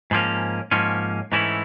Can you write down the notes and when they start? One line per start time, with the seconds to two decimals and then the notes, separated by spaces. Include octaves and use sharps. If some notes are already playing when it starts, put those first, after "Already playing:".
0.11 G#2 F3 A#3 C#4
0.71 G#2 F3 A#3 C#4
1.32 G#2 E3 A3 C#4 E4